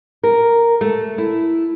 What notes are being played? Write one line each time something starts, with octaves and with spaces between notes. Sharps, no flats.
A#4
A3
E4